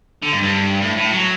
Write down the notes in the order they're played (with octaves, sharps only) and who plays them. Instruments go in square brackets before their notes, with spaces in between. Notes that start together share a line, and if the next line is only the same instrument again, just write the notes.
[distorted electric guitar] D3
G2
G2
A2
A2
F#3